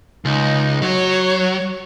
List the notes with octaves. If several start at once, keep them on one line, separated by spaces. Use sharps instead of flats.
C#2 D#4
F#3 C#5